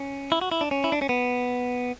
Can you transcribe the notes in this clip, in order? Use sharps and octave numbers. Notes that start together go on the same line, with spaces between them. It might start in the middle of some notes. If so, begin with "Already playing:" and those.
Already playing: C#4
E4
F#4
E4
D4
C#4
E4
D4
C#4
B3